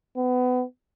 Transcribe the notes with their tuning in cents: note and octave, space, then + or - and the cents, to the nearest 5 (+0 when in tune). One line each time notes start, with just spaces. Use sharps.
B3 +25